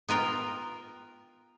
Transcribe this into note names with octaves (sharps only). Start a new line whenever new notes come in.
B3 F4 A#4 G5